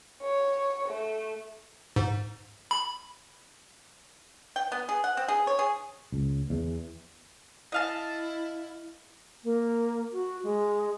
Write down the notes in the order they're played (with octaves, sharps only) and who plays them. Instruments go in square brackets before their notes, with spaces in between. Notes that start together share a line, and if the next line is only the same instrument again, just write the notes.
[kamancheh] C#5
A3
[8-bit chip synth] G#2
B5
[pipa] G5
B3
G#4
F#5
C4
G#4
C#5
G#4
[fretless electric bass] C#2
E2
[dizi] E4 [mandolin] D#5 F5 A5
[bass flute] A#3
F#4
G#3